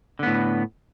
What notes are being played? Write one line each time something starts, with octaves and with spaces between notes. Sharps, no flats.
A2 D3 B3